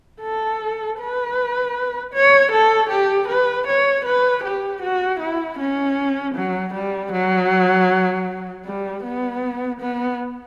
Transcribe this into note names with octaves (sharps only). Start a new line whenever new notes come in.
A4
B4
C#5
A4
G4
B4
C#5
B4
G4
F#4
E4
C#4
F#3
G3
F#3
G3
B3
B3